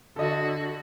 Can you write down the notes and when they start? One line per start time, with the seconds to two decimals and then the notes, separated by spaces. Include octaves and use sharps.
0.16 D3 F#4 A4 D#5